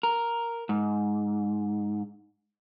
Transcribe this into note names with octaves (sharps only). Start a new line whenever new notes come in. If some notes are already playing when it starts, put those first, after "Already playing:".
A#4
G#2